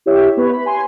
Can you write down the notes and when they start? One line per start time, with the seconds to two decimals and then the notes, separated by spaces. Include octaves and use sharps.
0.06 E4 G4 C#5 E5
0.37 B3 B4 C#5
0.53 B5
0.66 G#5 C6